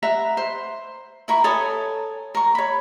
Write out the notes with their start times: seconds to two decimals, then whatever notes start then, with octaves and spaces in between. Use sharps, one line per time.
0.03 E5 F#5 A#5 B5
0.37 C5
1.28 E4 A#4 B5 C#6
1.44 A4 C#5 G#5 D#6
2.35 A#4 C#6
2.55 C#5 B5